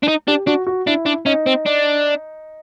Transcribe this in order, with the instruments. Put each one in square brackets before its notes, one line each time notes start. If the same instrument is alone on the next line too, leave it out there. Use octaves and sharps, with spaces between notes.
[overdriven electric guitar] D4
D#4
[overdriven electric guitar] D4 [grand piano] G4
[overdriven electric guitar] D4 [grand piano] F#4
[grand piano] F#4
[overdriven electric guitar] D4 [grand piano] E4
[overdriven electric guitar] D4
[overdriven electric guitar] C#4 [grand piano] D#4
[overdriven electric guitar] C4
D4